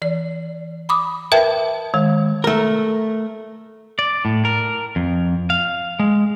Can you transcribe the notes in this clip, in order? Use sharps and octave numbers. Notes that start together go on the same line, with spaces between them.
E3 D5
B5 D6 D#6
A#4 B4 E5 G5 A5
D#3 G#3
A3 A#4
D5
A2
A#4
F2
F5
G#3